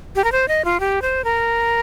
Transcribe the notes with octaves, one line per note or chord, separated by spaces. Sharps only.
G4
A#4
C5
D#5
F4
G4
C5
A#4